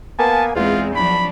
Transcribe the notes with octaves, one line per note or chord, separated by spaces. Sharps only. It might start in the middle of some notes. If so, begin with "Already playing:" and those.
A#3 B3 G#5 A5
E2 G#3 C4 F4
F3 F#3 D4 B5